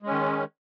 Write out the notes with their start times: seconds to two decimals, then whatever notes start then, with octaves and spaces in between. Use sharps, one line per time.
0.03 G#3
0.07 C#4
0.11 D#3